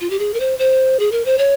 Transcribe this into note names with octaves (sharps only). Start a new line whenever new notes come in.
F4
G4
G#4
A#4
C5
C5
G#4
A#4
C5
C#5